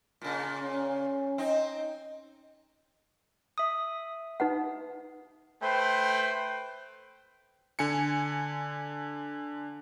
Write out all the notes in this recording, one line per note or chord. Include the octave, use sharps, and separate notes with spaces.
A#2 C#3
C#4
C4 D#4
E5 D#6
D#4 B4 F#5
A3 B4 C5 G5
D3 G#5 C#7